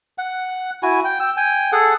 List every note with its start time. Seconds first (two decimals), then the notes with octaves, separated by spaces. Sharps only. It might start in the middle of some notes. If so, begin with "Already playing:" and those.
0.18 F#5
0.83 E4 F#4 G#5
1.05 G5
1.20 G5 E6
1.37 G5 G#5
1.72 G#4 A4 F#5